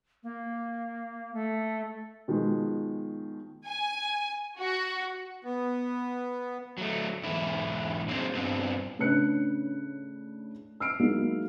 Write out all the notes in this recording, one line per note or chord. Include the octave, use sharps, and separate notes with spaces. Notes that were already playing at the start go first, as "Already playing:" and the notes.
A#3
A3
B2 D#3 F3 G#3
G#5
F#4
B3
F#3 A3
E2 G#2 E4
F#3 A#3 C4 G#4 C5
G2 B3 C4
A2 C#3 D4 B4 F#6 C#7
E6 F6 C7 D7
F#3 G#3 A#3 D#4 E4